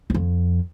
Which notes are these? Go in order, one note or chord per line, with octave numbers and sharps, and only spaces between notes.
E2
F2